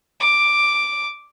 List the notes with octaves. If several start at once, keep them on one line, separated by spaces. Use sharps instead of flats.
D6